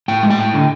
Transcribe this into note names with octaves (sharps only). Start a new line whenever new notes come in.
A2 G5
G#3
G5
A2
D3